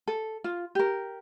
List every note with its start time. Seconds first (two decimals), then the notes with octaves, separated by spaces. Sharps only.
0.08 A4
0.44 F4
0.75 G4 A#4